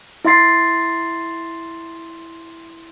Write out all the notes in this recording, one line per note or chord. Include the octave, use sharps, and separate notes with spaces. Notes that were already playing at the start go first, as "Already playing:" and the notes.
E4 E5 C6 A6 C7